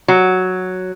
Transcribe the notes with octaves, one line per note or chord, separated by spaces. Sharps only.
F#3